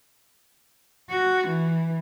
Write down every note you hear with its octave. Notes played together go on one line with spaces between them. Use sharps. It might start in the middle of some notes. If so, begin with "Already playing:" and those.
F#4
E3